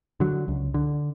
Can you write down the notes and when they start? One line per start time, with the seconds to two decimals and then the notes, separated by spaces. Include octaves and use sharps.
0.20 D3 F#3
0.48 C#2
0.74 D3